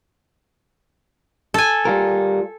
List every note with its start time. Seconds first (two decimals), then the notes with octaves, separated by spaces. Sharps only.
1.54 A4 G#5
1.85 G3 F4 A#4